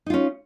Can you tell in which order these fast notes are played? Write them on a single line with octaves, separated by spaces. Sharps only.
D#4 F4 C#4